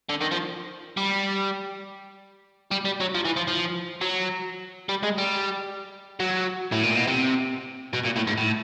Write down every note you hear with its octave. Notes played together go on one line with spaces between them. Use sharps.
D3
D#3
F3
G3
G3
G3
F#3
F3
E3
F3
F3
F#3
G3
G#3
G3
F#3
A2
A#2
B2
C3
B2
A#2
A2
G#2
A2